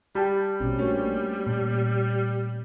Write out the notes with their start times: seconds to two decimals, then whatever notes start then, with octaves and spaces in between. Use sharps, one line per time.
0.15 G3 G4 G5 A5 B5
0.60 A#1 B2 C4 C#4
0.79 A3 A#3 C4 D4 F#4 C#5
1.46 A#2